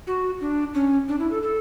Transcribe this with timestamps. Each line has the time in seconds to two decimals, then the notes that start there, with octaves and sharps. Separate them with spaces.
0.07 F#4
0.41 D4
0.74 C#4
1.08 D4
1.20 E4
1.31 A4
1.42 A4